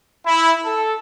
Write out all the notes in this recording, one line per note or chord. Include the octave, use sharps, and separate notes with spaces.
E4
A4